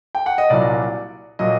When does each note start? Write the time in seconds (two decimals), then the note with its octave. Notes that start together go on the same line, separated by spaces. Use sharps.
0.15 G5
0.26 F#5
0.38 D#5
0.50 C2 A#2 F#3 D5
1.39 A#2 F#3 D#5